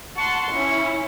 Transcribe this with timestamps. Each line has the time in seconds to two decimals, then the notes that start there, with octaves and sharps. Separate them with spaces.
0.17 F#5 A5 C6 C#6
0.52 C#4 E4